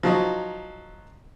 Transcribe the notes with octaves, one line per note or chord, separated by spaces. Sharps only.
F3 F#3 D#4